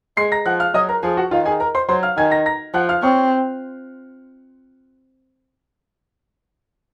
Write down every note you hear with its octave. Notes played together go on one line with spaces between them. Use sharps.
G#3 C6 C7
A#5 A#6
F3 F#5 F#6
F5 F6
F#3 D#5 D#6
A#4 A#5
F3 G#4 G#5
F#4 F#5
D#3 F4 F5
G#4 G#5
A#4 A#5
C5 C6
F#3 C5 C6
F5 F6
D#3 G#5 G#6
A#5 A#6
A#5 A#6
F3 F#5 F#6
F5 F6
C4 C#5 C#6